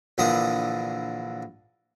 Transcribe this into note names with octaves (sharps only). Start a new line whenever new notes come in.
A#1 D3 E3 A#3 D5 D#6